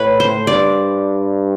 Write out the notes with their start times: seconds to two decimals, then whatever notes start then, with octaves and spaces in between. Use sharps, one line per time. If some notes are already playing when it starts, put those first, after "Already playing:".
Already playing: A2 B4 C#5
0.20 C5
0.47 G2 D5